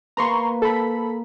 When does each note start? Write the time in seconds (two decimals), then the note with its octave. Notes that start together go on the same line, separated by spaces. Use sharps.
0.17 A#3 B4 A#5 C6 C#6
0.62 A4 B5